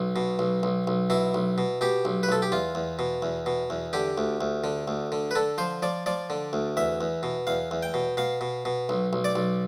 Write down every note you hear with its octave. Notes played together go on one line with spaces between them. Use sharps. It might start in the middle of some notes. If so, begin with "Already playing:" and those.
Already playing: B1
B2
B1
B1
B1
B2 E4
B1
B2
B2 G4
B1
B4
B1 A4
G4
E2 F4
E2
B2
E2
B2
E2
D3 G4
D2
D2
D3
D2
D3
B4
D3 A4
F3 C5
F3 D5
F3 D5
D3
D2
E2 E5
E2
B2
E2 F5
E2
G5
B2
B2 F5
B2
B2
B1
B1
D5
B1